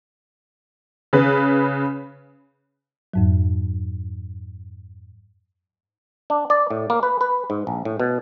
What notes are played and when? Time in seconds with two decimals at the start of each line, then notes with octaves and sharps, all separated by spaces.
1.13 C#3 B4
3.14 F2 G#2 F#3
6.30 D4
6.50 D5
6.71 A2
6.90 A#3
7.03 B4
7.21 B4
7.50 G#2
7.67 A#1
7.85 A2
8.00 B2